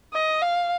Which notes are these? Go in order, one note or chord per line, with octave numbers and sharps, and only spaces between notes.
D#5
F5